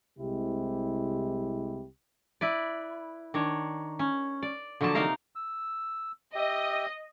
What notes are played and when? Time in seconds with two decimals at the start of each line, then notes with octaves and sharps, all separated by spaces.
0.19 C2 C3 G#3 E4 G4
2.41 E4 B4 D5
3.34 D#3 D4 C#5
3.99 C#4
4.42 D5
4.81 D3 F3 F#3 A#3 A5
4.95 C3 D#4 A#4 F5 A#5
5.35 E6
6.35 G4 D#5 E5 G5